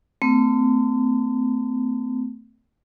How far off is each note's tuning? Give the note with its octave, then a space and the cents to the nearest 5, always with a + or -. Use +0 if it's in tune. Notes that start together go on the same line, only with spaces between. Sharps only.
A3 +25 C4 -35